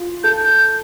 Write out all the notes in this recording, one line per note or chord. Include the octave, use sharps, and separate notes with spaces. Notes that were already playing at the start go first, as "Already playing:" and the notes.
Already playing: F4
A4 G6
G6